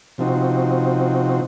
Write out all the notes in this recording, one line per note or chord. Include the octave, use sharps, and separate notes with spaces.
C3 F3 C4 D#4 F#4